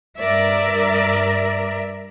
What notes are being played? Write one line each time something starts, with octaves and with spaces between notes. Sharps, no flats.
G2 A#4 D5 E5